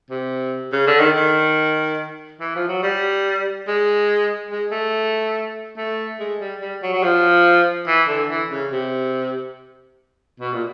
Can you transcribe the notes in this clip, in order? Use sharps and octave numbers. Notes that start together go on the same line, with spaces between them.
C3
C#3
D3
D#3
D#3
E3
F3
F#3
G3
G#3
G#3
A3
A3
G#3
G3
G3
F#3
F#3
F3
E3
D3
E3
C#3
C3
B2
A#2